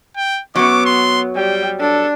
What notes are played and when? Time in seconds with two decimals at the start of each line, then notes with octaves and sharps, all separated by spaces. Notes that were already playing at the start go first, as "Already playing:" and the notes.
0.17 G5
0.56 F#2 F#3 B3 D6
0.86 C6
1.36 G3 G5
1.80 D4 A4